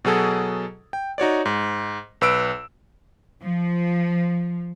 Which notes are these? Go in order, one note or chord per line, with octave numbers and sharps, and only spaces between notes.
B2 F#3 G#4 A4
G5
D#4 F#4 C#5 D5
G#2
B1 B4 E6 D7
F3